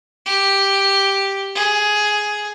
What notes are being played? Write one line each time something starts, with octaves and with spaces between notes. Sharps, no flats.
G4
G#4